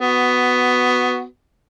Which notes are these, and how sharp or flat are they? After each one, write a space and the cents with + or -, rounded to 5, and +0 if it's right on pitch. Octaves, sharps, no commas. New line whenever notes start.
B3 +10 F#4 +0